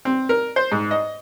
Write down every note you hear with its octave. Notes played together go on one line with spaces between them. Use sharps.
C4
A#4
C5
G#2
D#5